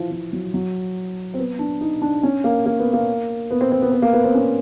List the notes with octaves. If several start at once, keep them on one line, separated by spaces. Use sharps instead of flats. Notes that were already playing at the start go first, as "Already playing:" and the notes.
Already playing: E3 F3
F3
F#3
F#3
C4
B3
D4
D#4
D4
C#4
A#3
A#3
B3
A#3
B3
C4
C4
B3
B3
A#3
B3
C4
C#4